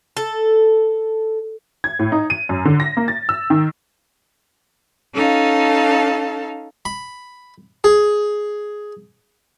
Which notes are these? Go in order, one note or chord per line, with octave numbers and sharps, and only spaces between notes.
A4
G#6
A2
D#4
D#7
F#2
D3
A#6
A#3
A6
E6
D#3
C#4 D#4 A4 F5 A5
B5
G#4